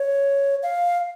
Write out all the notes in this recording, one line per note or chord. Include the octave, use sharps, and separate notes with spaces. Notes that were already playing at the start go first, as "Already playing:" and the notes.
Already playing: C#5
F5